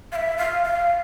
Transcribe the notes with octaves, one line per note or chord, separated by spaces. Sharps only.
F5
E5
F5
F5